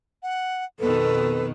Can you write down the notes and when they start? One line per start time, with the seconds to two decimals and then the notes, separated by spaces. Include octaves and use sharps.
0.23 F#5
0.80 F2 B2 D#3 A4 B4